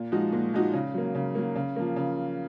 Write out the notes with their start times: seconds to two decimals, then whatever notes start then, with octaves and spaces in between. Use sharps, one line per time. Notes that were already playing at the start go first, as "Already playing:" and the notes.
Already playing: A#2
0.12 F3 G#3 D#4 F#4
0.32 A#2
0.53 F3 G#3 D#4 F#4
0.73 C#3
0.94 F#3 A#3
1.15 C#3
1.35 F#3 A#3
1.55 C#3
1.76 F3 A#3
1.96 C#3